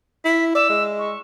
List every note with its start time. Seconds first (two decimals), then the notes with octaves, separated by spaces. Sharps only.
0.25 E4 B6
0.55 D5 E6
0.70 G#3
0.99 C#6